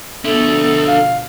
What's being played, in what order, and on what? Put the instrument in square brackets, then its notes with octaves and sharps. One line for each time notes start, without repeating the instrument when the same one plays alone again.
[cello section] B2 D3 F3 [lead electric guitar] D4 E5 [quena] A4
[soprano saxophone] F5